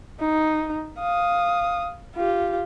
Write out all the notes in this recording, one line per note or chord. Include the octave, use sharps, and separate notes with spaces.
D#4
F5 D#6
F4 G4